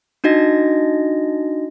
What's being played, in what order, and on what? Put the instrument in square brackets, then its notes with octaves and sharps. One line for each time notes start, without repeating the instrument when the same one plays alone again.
[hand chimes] D4 D#4 F#4 D#5 A#6